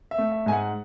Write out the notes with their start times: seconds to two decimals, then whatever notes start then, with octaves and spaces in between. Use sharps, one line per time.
0.11 E5
0.18 A3
0.32 E5
0.46 G#2 G#5
0.52 F#5